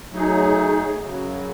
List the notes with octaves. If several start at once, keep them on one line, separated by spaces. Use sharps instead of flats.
F#3 A3 D#4 G#4
F#2 C#3 F#3